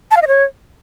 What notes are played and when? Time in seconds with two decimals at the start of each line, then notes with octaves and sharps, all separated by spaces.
0.11 A5
0.17 F5
0.22 D#5
0.28 C#5